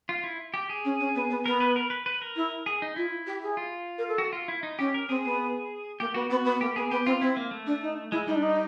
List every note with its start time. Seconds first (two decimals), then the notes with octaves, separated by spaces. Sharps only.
0.09 F4
0.24 E4
0.54 G4
0.69 G#4
0.85 C#4
1.00 C#4
1.15 B3
1.30 B3
1.45 B3 A#4
1.60 B4
1.76 A#4
1.90 B4
2.06 B4
2.22 A#4
2.36 E4
2.66 G#4
2.82 D#4
2.96 E4 F4
3.27 G4
3.42 G#4
3.57 F4
3.98 A#4
4.08 A4
4.18 F#4
4.33 F4
4.48 E4
4.63 D#4
4.79 C#4 G4
4.94 A#4
5.09 C4 G#4
5.24 B3
6.00 A#3 G4
6.14 B3 F#4
6.30 B3 F#4
6.45 B3
6.60 A#3 G4
6.76 B3 G#4
6.91 B3 G4
7.06 C4 F4
7.21 C4 E4
7.36 A#3
7.51 A3
7.66 D4
7.82 D#4
8.12 G#3 E4
8.27 G3 D#4
8.35 D4
8.43 D#4